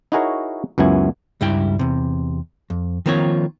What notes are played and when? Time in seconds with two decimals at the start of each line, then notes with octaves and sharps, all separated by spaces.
0.12 D#4 E4 F#4 G#4 A#4 C#5
0.78 C#2 F#2 B3 E4 G#5
1.41 C#2 G2 G3 E4 G5
1.79 E2 C3
2.70 F2
3.06 D#3 F3 A#3 C4 F4 C#5